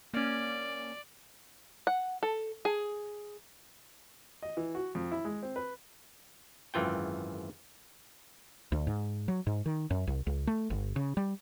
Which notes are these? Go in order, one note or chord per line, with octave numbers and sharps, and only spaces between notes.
A#3 C#4 D5
F#5
A4
G#4
D#5
E3
F#4
F2
E4
G#3
C4
B4
G#1 F#2 E3 F4 G5
D2
G#2
F#3
G#2
D#3
F#2
C2
C#2
A3
G1
C#3
G3